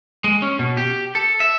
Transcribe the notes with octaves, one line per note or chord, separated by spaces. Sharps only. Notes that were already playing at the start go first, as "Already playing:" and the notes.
G#3
C#4
B2
G4
A4
E5